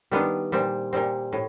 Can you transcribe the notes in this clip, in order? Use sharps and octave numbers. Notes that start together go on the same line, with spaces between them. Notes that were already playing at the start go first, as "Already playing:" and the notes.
D#3 G3 B3 D4 F4
A#2 G3 C4
A#2 G3 C4
A2